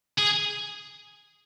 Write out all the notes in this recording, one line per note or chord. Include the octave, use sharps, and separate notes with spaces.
G#4